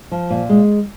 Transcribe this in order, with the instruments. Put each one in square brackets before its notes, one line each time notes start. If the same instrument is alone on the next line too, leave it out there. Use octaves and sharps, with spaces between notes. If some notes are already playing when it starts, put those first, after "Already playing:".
[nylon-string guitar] F3
A#2
G#3